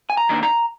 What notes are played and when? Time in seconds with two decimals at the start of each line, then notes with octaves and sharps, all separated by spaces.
0.10 G#5
0.17 A#5
0.29 D#3 A#3 D4
0.43 A#5